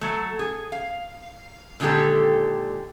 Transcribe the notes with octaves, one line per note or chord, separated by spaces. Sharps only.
F#3 A3
G#4
F5
A#2 D3 D#3 G#3 G4 A4